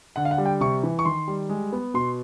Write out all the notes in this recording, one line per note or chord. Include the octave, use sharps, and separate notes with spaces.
D3 F#5
F5
F#5
G3
G5
C3 C#6
E3
C#6
D#3 C6
G3
G#3
B3
B2 C6